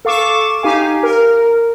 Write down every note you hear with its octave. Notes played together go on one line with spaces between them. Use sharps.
A4 F5 C#6 D6 E7
D#4 G4 F5 G#5
A#4